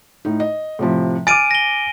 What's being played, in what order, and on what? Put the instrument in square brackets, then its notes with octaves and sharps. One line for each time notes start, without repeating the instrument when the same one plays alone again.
[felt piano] A2 D#4
D#5
A2 C3 F3
[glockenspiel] G#5 D7 D#7 [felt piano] D6 F6 A6
[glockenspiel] A#6 G7